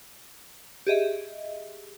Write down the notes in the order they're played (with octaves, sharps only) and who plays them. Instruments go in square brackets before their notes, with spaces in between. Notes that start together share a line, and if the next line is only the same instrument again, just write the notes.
[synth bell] G4 G#4 D#5 E5